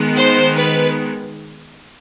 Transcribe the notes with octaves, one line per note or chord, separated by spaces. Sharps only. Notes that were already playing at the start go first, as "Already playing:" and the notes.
Already playing: D#3 G#3 B3
C5
B4